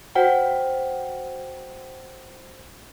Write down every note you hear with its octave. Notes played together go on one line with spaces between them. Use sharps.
F#4 C5 F#5 G5